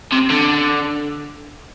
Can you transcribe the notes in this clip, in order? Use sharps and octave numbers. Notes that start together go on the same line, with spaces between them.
C3
D3